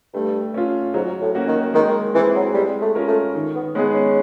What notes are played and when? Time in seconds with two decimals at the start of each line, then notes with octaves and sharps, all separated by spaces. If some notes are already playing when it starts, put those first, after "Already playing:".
0.14 G2 A3
0.54 C#4 F4
0.94 G#2 F#3
1.21 A2
1.35 A#3 C#4 F#4
1.47 D#3
1.74 D#3 G#3
2.14 E3 C4 E4 G#4
2.35 F#3
2.54 G3 G#3
2.82 A3
2.95 C#4 F4 A#4
3.08 A3
3.35 D#3
3.55 B3
3.75 G#3 B3 C#4 D#4 G#4
3.94 C#4